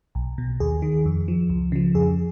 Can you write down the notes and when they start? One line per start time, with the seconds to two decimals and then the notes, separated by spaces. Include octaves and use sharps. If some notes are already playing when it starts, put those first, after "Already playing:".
0.15 B1
0.38 B2
0.60 D#2 G#4
0.82 D#3
1.05 F2
1.28 F3
1.49 C#2
1.72 C#3 F3
1.94 F2 G#4